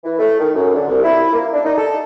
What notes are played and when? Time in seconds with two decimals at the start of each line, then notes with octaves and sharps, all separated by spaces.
0.04 E3
0.19 A3
0.39 D#3
0.54 F#2
0.75 D3
0.88 C2
1.04 E4
1.33 A#3
1.53 D4
1.65 D#4
1.77 A4